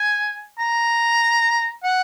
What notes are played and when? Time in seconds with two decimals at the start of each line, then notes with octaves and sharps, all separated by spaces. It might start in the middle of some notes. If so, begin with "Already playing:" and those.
Already playing: G#5
0.59 A#5
1.84 F#5